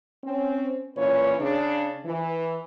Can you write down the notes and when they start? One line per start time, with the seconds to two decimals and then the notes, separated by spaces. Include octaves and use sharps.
0.24 C4 C#4
0.97 A#2 E3 C#4 B4 C#5
1.40 C#3 D4
2.06 E3